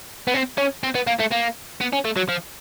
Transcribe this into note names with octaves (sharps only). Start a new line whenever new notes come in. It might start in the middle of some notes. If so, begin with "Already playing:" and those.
B3
C4
C#4
C4
B3
A#3
A3
A#3
B3
C#4
A3
F#3
F3